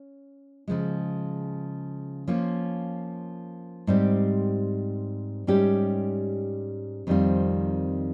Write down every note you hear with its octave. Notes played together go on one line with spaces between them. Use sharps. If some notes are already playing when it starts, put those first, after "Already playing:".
Already playing: C#4
C#3 F3 G#3
F3 A#3 C#4 F4
G#2 G3 C4 G4
G#2 G3 C#4 G4
F2 D#3 G3 C4 F4